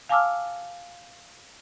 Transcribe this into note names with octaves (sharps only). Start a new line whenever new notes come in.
F5 G#5 A5 D6 E6 F6